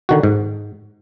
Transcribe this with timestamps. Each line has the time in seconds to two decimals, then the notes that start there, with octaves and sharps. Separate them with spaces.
0.09 D3 D#3 F#4
0.23 G#2